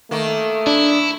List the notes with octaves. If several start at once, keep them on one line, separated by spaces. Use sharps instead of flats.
D#3 A3 A#3
D4 E4